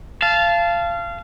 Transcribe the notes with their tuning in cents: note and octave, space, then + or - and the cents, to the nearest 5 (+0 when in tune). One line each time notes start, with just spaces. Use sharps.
F5 -25 A5 -15